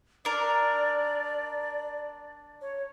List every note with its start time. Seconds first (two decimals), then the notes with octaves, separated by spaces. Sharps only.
0.25 D4 A#4 D5
2.61 C#5